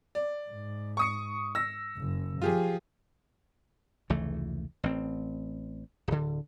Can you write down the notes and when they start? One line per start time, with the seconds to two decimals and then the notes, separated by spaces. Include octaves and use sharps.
0.15 D5
0.50 G#2
0.97 C#6 D#6 C#7
1.55 E6 A#6
1.96 F#1
2.42 F3 F4 G4 G#4
4.10 F1 C#2 E3 A3
4.83 A1 C4
6.08 D1 D3